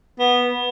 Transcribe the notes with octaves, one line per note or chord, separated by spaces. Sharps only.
B3